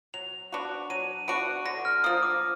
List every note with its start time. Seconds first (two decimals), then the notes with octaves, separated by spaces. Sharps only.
0.14 F#3 F7
0.52 B3 D4 F#4
0.90 F#3 D#7
1.28 B3 D4 F#4 D7
1.65 D3 A#6
1.85 F6
2.04 F3 A#3 D#6
2.23 D6